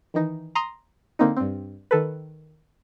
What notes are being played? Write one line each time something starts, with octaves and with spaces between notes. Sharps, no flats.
D#3 E3 D#4
A#5 C6 D#6
D3 A#3 C4 D#4
G2 C4
D#3 A4 B4